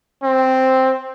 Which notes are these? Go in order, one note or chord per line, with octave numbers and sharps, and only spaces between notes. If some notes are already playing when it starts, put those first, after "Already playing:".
C4